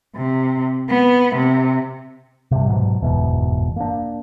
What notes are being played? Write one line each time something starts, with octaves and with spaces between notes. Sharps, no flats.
C3
B3
C3
G2 C3
G#2 B2 E3 F#3
F#1 E2 G#2 B2
A#3 D4